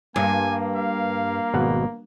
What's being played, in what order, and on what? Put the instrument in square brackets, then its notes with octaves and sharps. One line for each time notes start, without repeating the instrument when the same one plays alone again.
[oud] G2 [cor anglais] A#3 [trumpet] G#5
[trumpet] F5
[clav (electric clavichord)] G#1 B2 F#5